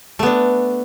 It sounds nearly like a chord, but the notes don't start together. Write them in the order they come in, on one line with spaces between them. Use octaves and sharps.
A3 B3 D4